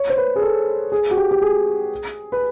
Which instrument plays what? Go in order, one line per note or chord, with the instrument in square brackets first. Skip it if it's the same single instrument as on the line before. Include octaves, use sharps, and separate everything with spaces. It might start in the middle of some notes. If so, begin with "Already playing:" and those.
Already playing: [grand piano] C#5
C5
B4
G#4
A4
G#4
F#4
G4
G4
G#4
B4